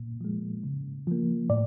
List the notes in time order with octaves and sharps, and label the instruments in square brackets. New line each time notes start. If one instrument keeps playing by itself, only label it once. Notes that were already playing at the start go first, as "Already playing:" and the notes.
Already playing: [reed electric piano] A#2
F3 G#3
C#3
F3 A#3
A2 D5